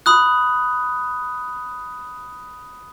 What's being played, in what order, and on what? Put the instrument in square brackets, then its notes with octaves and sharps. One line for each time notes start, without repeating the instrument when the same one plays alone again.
[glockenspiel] B5 D#6 F#6